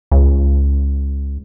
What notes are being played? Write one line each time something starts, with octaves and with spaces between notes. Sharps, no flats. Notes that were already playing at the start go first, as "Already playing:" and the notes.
C#2